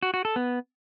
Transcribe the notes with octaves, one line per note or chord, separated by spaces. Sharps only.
F#4
F#4
A4
B3